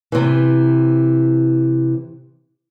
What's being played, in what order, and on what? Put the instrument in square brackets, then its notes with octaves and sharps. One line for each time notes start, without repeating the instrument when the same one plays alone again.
[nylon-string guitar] C3 E3